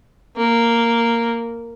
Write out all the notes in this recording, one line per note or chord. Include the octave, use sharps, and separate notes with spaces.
A#3